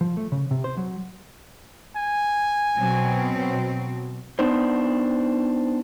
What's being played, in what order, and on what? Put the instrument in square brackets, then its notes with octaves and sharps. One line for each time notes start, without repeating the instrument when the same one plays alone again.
[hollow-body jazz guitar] F3
A3
C#3
C3
C5
F#3
[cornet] G#5
[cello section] B2 F#3 C4
[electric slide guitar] B3 D4 D#4 C5